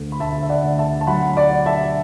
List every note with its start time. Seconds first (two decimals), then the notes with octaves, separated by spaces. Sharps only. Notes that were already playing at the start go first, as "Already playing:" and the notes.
Already playing: D2 A3
0.12 B5
0.20 D2 E5 A5
0.42 E5
0.49 D5 F#5
0.63 D2
0.78 E5 A5
1.01 A5
1.07 F#3 F#5 B5
1.37 D5 F#5
1.51 D4
1.66 E5 A5